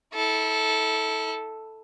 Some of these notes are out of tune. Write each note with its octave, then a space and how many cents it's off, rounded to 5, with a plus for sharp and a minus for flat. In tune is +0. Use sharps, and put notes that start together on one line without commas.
E4 -35 A4 -5